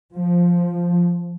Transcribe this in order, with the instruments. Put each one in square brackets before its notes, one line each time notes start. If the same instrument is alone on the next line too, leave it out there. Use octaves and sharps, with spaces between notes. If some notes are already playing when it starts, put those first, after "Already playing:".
[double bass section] F3